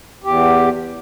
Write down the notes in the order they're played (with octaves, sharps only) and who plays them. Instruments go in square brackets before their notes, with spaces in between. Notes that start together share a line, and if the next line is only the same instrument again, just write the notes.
[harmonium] E2 G4